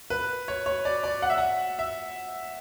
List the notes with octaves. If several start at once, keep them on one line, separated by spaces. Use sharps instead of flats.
B4
C#5
C#5
D5
D5
F#5
E5
F#5
E5